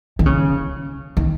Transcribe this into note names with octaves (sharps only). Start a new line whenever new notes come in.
D#3
C#3
D#3